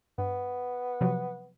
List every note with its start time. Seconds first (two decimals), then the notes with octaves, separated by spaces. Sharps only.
0.18 G2 B3
1.01 C3 F3 F#3